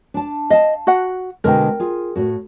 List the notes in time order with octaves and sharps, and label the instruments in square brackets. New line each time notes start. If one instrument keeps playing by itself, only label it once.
[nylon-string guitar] D4 A5
[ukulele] D#5 [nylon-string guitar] F5 A5
[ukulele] F#4 F#5
[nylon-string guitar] B2 D3 G#3 [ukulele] A#4 G5
[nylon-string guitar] F4 G#4
A2 F#4